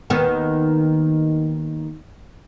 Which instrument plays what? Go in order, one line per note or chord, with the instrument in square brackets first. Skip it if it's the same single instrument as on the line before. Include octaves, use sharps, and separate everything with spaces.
[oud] D#2 D#3 B3